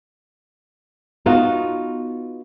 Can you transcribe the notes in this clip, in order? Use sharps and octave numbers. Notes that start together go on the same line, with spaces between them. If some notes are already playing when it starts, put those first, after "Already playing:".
B3 D#4 F4 F#4